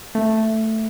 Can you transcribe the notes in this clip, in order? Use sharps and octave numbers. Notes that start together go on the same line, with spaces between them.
A3